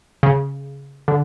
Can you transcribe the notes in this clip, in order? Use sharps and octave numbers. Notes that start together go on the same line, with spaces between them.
C#3
D3